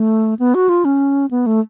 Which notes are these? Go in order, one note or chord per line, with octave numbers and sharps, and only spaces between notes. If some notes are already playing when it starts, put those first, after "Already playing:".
Already playing: A3
B3
F#4
F4
C#4
B3
A3